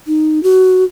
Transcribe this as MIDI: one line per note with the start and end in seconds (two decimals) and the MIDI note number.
0.07 0.42 63
0.43 0.84 66